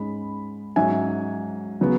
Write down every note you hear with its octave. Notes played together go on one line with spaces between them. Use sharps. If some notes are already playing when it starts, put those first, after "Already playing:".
Already playing: G#2 G#3 C#4 B5
G#2 F#3 C#4 E5 G#5
C#3 F#3 B3